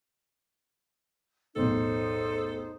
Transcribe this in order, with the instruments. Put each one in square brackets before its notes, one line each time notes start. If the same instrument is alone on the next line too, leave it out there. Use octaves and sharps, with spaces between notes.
[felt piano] B1 E2 A2 [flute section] D#4 C5 [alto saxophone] A4